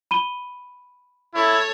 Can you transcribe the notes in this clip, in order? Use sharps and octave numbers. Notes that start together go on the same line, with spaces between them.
B5 D#7 G7
E4 A4 C#5